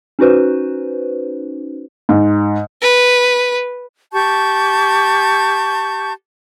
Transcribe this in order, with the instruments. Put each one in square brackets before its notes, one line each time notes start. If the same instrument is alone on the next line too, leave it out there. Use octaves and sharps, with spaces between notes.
[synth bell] C#4 D#4 F#4 B4 C5
[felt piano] G#2
[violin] B4
[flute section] G4 A5 C#6 G6